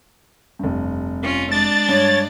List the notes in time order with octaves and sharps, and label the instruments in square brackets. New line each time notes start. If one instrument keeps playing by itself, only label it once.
[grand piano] F1 G2
[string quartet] C#4 F4
[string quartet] G#3 D4 D5 [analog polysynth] A6
[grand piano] G2 [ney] C#5